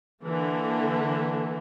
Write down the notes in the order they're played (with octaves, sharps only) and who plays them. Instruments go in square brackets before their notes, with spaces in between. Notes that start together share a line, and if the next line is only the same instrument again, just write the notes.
[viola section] D3 E3 A#3 A4